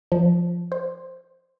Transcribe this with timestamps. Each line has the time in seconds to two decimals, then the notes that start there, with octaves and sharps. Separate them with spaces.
0.12 F3
0.72 C5